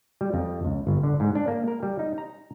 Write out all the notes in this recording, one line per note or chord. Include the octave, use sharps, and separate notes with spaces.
G3
F2
C#2
G1
D3
G#2
D4
A#3
A#4
G3
D#4
A#5